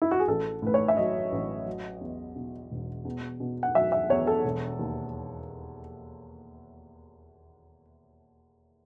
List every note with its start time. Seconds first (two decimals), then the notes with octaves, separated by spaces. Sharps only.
0.02 E4
0.11 F#4
0.20 G#4
0.28 A1 A4
0.62 A2 B4
0.74 C#5
0.88 E5
0.97 F#3 D#5
1.32 A1
1.66 F#3
2.01 E2
2.36 B2
2.71 E1
3.05 E2
3.40 B2
3.63 F#5
3.75 F#3 E5
3.92 E5
4.09 E2 C#5
4.27 A4
4.45 E1
4.79 D#2